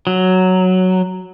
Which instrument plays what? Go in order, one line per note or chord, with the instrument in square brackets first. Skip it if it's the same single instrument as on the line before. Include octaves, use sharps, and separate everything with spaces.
[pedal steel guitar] F#3